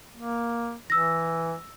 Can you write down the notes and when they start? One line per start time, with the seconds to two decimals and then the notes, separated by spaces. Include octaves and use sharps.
0.17 A#3
0.90 E3 E6 A#6